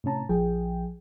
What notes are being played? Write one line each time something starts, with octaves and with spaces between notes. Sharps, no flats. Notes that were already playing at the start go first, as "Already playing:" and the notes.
A2 C3 C#4 A5 A#5
A#1 F3 G#4 G5